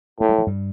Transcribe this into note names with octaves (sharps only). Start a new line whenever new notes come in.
A2 A3
G3
F3
G2 G3